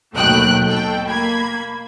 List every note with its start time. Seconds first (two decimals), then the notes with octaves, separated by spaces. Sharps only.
0.13 D#2 B2 F#3 A3 G5 F#6
0.66 B2 A4 G5
1.07 A#3 B5 G#6